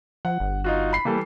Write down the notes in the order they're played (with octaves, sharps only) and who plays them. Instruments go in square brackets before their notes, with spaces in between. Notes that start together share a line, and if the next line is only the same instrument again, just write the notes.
[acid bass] F3 [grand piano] F#5
[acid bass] G1
[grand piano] D#4 F4 F#4
B5 C7
[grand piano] E3 G3 A4 [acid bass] A#3